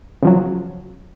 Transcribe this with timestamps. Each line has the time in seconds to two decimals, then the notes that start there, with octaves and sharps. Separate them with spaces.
0.23 C#3 F3 F#3